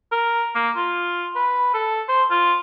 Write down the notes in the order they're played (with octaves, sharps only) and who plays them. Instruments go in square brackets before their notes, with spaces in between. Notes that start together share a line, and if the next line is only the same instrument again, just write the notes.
[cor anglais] A#4
A#3
F4
B4
A4
C5
F4